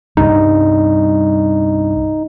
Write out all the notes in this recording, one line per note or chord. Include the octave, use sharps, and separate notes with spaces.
C2 G2 G3 D#4